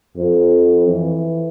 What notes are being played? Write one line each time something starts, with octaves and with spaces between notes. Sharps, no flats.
F2
E3